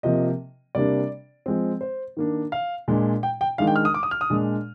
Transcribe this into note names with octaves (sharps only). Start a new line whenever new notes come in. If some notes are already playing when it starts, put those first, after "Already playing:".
C3 F3 A#3 D#5
C3 G3 A#3 D4 D5
F3 G#3 C4
C5
D#3 A#3 D4
F5
A#2 G#3 D4
G5
G5
D#3 G#3 D4 F5
G5
F6
D#6
D6
D#6
F6
D#6
A#2 G#3 D4